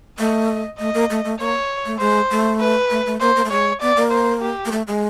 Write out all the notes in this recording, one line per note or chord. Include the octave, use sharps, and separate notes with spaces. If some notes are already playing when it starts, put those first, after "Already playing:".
A3 D#5
A3 D#5
A#3
A3
A3
A#3 C#5
A3
G#3 C5
A3
B4
A3
A3
A#3 C5
A#3
A3
G#3 C#5
B3 D5
A#3
C5
G4
A#3
A3
G#3